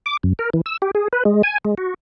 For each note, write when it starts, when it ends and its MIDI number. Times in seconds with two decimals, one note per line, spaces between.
0.06 0.17 86
0.23 0.33 42
0.39 0.50 70
0.53 0.61 52
0.66 0.77 88
0.82 0.91 67
0.95 1.08 68
1.13 1.23 71
1.25 1.42 56
1.43 1.58 80
1.65 1.75 56
1.78 1.94 66